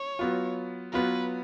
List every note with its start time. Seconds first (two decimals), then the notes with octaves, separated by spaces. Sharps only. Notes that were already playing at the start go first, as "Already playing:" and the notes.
Already playing: C#5
0.19 F#3 B3 F4
0.92 F#3 B3 F4 B4